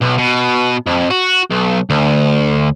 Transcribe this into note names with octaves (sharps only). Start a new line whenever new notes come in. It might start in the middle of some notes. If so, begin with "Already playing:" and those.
B1
B2
F2
F#4
B1
D2